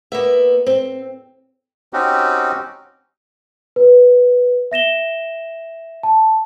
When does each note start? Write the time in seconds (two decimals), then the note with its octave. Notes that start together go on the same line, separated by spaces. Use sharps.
0.12 A#3 B3 E5
0.67 C4
1.93 C4 C#4 D#4 F#4 G4
3.76 B4
4.71 E5 A#6 E7 G7
6.03 A5